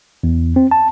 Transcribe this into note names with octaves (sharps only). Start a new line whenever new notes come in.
E2
C4
A5